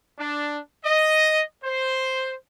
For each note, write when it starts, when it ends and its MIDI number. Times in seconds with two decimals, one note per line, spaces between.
0.18 0.58 62
0.84 1.42 75
1.63 2.35 72